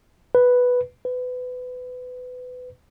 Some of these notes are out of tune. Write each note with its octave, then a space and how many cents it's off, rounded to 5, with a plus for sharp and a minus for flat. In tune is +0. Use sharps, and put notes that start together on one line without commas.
B4 +0
B4 +25